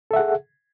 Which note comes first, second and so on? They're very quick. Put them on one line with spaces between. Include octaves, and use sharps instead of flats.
A4 E5 F#5 G#4